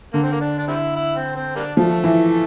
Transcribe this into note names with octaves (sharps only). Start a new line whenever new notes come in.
D3 A#3
C4
A#3
D4
D4
G3 C4 E4
E4
C4
C4
G3 A#3 D4
F3 A3
E3